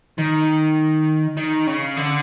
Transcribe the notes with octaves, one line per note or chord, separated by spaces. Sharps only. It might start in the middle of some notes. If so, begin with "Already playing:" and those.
D#3
D#3
C#3
D3